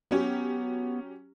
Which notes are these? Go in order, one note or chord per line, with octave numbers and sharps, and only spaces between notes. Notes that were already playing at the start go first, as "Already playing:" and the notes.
F#3 B3 C#4 G4